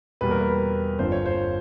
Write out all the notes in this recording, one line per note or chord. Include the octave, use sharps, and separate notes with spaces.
E2 B2 G3 A#3 B4
A#4
B4
G1 F2 D3 F3 C5
C#5
C5